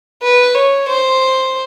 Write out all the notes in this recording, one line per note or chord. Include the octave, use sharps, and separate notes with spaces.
B4
C#5
C5